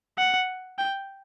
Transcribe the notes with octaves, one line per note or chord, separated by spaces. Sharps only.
F#5
G5